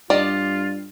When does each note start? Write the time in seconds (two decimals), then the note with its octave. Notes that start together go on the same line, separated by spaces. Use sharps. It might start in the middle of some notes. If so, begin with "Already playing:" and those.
0.10 G2 F4 G4 D5 D#5